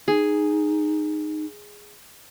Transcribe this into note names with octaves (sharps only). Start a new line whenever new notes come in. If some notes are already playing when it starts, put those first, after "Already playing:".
D#4 G#4